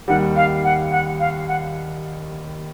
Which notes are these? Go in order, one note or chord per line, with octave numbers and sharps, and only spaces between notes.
D#2 D#3 G3 F#5
F5
F#5
F#5
F5
F#5